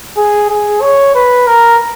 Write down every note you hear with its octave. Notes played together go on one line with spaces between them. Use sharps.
G#4
G#4
C#5
B4
A#4